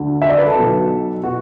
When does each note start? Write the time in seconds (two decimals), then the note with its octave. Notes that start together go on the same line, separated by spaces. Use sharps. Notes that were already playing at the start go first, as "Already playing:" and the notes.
Already playing: D2 D3
0.22 E5
0.29 D5
0.38 B4
0.47 A4
0.56 B1 B2
1.23 B2 F#4